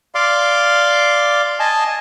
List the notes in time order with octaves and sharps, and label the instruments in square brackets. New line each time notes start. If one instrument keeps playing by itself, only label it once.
[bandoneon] D5 F5 C6 D6
D#5 G#5 A5